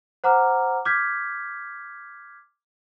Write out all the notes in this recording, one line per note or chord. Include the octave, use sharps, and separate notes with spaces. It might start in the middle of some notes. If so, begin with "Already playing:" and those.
C5 F#5 A#5 D6 F6
D6 F6 G6 G#6 B6